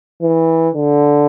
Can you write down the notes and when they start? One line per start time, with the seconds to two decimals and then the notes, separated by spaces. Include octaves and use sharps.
0.22 E3
0.75 D3